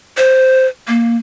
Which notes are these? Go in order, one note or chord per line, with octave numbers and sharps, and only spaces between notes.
C5
A#3